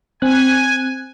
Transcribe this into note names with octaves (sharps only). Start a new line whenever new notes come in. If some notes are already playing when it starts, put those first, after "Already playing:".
C4 G#5 F#6